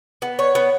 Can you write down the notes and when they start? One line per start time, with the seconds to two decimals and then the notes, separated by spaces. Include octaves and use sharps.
0.22 B3
0.39 C#5
0.55 B3